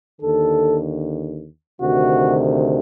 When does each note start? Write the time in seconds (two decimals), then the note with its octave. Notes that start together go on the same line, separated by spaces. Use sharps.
0.21 D#2 D3 A4
1.81 D2 C3 D#3 F#4